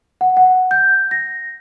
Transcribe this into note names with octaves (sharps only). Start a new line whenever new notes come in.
F#5
F#5
G6
A#6